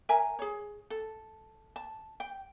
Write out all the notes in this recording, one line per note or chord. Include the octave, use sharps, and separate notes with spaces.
A#4 E5 G#5 A#5
G#4 C#5
A4
A5
G5